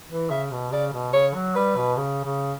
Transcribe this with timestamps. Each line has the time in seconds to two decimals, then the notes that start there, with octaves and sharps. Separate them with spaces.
0.10 E3
0.30 C#3 E5
0.52 B2
0.72 C#3 D5
0.93 B2
1.13 C#3 C#5
1.35 F#3
1.55 G3 B4
1.76 B2
1.97 C#3
2.24 C#3